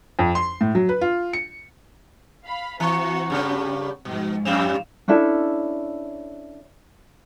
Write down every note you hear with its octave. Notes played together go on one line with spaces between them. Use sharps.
F2
C6
A2
F#3
B4
F4
C#7
F5 B5
E3 C4 F#4 A#5 C#6
G2 C#3
G#2 B2 F3
F2 G3 C4 F5 E7 F7
C#4 D4 E4 A4